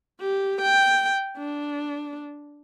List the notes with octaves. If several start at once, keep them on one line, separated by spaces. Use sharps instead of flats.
G4
G5
D4